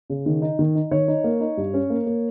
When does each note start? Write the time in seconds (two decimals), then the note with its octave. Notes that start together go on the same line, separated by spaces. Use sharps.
0.10 C#3
0.26 D#3
0.42 D#4
0.59 D#3
0.75 D#4
0.91 D#3 C#5
1.08 D#4
1.24 A#3
1.41 D#4
1.57 G2
1.74 C#4
1.90 A#3
2.06 A#3